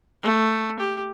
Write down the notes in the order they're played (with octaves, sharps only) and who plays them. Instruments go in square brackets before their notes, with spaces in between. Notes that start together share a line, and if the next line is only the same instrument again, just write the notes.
[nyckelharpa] A3
G4